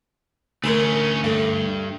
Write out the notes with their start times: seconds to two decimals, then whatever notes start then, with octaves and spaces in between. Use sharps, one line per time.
0.64 D2 A3 C#4 G#4 A#4
1.24 G2 A3